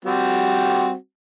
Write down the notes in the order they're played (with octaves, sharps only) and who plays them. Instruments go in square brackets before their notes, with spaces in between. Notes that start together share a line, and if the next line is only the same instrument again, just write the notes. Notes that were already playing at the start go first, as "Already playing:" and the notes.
[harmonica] G3 C4 F#4